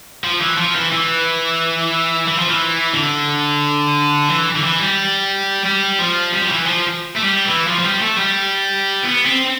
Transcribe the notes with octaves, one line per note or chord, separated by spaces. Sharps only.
F3
E3
F3
E3
E3
E3
F3
E3
D3
E3
D3
E3
G3
G3
F3
G3
F3
E3
F3
A3
G3
E3
F3
F3
G3
A3
G3
B3
C4